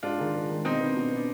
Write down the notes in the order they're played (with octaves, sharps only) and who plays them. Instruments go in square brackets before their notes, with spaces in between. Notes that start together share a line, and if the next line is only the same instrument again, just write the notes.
[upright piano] G#2 [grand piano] D4 F4
[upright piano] D#3 G#3
G#2
D#3 G#3
[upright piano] B2 [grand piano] C4 D#4
[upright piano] B3 D4
B2
B3 D4